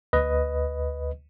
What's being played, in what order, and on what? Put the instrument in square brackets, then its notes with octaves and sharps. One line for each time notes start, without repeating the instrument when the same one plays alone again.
[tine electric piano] D2 B4 D#5